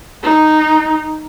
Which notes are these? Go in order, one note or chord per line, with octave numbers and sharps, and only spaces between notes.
D#4